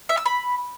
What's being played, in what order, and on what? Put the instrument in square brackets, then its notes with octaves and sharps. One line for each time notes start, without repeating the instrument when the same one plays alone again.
[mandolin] E5
E6
B5